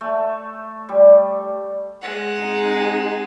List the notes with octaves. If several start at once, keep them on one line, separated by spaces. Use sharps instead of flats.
A3
G3
G#3 F#5
C4 D#4 G#4